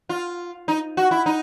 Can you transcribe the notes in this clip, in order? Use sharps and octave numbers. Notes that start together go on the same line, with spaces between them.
F4
D#4
F#4
E4
D#4